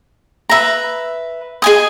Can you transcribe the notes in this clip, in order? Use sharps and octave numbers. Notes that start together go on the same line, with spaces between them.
B4 E5 A#5
G#4 D#5 G#5 D#6